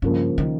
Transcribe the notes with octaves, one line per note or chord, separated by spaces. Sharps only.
G2 C#3 F3 A#3
D#3